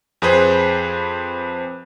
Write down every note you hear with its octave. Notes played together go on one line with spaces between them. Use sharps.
F2 G#4 B4 C5